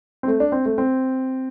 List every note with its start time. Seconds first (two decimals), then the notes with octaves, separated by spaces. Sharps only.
0.23 C4
0.28 A3
0.40 D4
0.52 C4
0.66 A3
0.78 C4